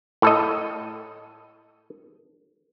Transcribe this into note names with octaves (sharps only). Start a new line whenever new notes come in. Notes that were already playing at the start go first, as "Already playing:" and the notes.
A2 A4 D#5